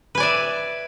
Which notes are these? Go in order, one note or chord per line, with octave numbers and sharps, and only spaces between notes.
B4 D5 E5 G#5